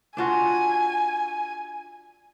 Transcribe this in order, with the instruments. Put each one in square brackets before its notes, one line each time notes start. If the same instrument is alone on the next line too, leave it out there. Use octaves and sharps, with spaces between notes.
[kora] D4 F4 F#4 [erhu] G#5